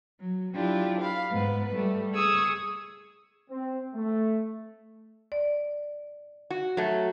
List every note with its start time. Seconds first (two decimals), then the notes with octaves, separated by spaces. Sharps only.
0.20 F#3
0.54 F#3 D4 E4 F4 G4
1.01 F5 B5
1.31 G#2 B3 B4
1.74 G3 A3
2.15 G#4 C#6 D#6 E6 G#6
3.49 C4
3.94 A3
5.32 D5
6.50 F#4
6.77 F#3 A3